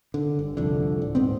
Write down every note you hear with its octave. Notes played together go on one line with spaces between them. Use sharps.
D3
G1
C2 F2 D3
D1
D#1 G#2 B3 C4